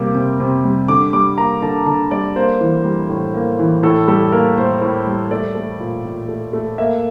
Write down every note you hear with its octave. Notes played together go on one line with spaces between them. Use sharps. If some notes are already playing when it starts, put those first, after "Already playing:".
Already playing: C3 G3 A#3 D6
C3
C3
G3
D3 D6
G3 D6
A#3 A#5
D3 A5
D3 A5
G3 D5
A#3 C5
E3
G3
A2
A#3
E3
A2 A4
G3 A4
A#3 A#4
A2 C5
A2
G3
A3 D5
A3
A#2
A#2
A3
A3
A#3 E5